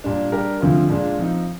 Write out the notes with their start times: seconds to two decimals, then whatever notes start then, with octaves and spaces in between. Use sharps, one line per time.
0.04 A#2 G3 D4
0.32 G3 D4 G4 A#4
0.61 D2 D3 F3 C4 F4
0.90 A#2 G#3 D4 F4
1.18 F3 C4 D#4